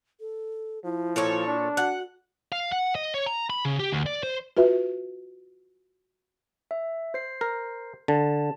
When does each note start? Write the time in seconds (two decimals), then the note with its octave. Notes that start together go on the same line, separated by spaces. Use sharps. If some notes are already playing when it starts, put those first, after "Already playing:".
0.20 A4
0.84 F3 E4
1.16 A#2 A4 C#5
1.47 D4
1.77 F#4 F#5
2.52 F5
2.72 F#5
2.95 D#5
3.14 C#5
3.26 A#5
3.50 B5
3.65 C#3
3.80 G4
3.92 D2
4.06 D5
4.23 C5
4.57 F4 F#4 B4 E5
6.71 E5
7.14 C5 C7
7.41 A#4
8.08 D3 A5